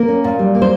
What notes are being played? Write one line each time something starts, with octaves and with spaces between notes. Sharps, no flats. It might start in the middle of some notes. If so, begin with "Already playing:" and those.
Already playing: A#3 A#4
C#4
A#2
G3
A#3
C5